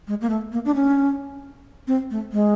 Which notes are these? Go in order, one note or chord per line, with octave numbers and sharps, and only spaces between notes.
G#3
A#3
A3
A#3
D4
C#4
C4
A3
G#3